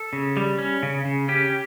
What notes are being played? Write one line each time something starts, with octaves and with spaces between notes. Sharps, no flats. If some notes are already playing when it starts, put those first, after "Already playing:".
Already playing: A4
C#3
G3
C#4
C#3
C#3
C#4 G4